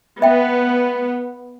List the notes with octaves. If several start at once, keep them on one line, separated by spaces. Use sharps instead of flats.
B3 E5 G5